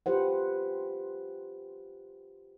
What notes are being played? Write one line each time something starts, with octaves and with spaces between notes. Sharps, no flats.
F4 G4 B4 C5 F#5